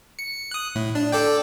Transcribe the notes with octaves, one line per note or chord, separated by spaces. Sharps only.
C#7
D#6 F#6
A2
D4
A4 D5 G5